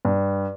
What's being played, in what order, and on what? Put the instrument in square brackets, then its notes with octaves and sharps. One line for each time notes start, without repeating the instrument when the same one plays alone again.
[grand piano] G2